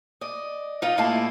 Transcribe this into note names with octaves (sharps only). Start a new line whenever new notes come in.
D5 D#5
D#4 F4 D#5
A2 G#3 A#3 E4 F4 A5